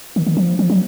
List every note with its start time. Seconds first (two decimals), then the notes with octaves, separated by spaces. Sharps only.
0.16 D#3
0.26 D#3
0.37 F3
0.59 F3
0.70 F#3